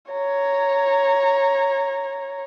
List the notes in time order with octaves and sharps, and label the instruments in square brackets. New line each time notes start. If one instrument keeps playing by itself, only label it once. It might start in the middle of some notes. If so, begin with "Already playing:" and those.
[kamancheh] C#5 A#5